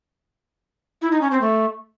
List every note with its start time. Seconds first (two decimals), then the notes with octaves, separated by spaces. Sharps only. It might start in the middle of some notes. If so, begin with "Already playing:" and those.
1.02 E4
1.12 D#4
1.21 C#4
1.31 C4
1.41 A3